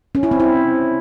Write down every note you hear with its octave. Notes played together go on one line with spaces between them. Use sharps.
C#4
E4
C4
E4